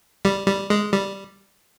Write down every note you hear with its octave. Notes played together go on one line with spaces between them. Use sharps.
G3
G3
G#3
G3